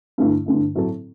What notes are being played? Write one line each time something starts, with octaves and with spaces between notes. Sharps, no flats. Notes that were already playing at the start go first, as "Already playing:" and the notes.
G2 D3 A3 E4
G2 D3 A3 E4
A2 F#3 C4 E4 A4